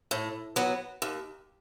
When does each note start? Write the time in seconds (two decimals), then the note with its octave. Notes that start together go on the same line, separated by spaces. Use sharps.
0.11 A2
0.56 F#3 B3
1.02 D#2